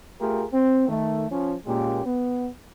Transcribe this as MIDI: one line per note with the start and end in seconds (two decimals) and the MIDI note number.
0.21 0.45 57
0.21 0.45 65
0.21 0.45 67
0.21 0.45 68
0.21 0.45 70
0.54 0.87 60
0.88 1.26 51
0.88 1.26 57
1.31 1.54 53
1.31 1.54 61
1.66 2.04 46
1.66 2.04 56
1.66 2.04 58
1.66 2.04 61
1.66 2.04 67
2.06 2.49 59